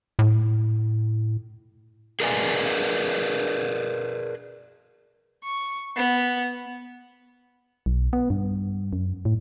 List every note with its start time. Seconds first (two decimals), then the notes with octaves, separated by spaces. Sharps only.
0.19 A2
2.20 G#4 A#4 B4 D5 D#5 G#5
5.44 C#6
5.96 B3
7.86 B1
8.13 B3
8.30 G2
8.93 F#2
9.25 A2